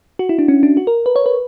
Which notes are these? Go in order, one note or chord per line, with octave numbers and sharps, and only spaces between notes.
F#4
E4
D4
C#4
D4
F#4
A#4
B4
C#5
B4